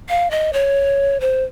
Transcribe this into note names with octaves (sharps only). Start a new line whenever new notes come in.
F5
D#5
C#5
C5